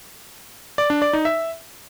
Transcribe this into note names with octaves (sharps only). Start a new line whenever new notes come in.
D5
D4
D5
D#4
E5